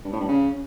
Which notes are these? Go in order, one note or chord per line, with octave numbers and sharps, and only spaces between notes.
G2
A2
G2
C#3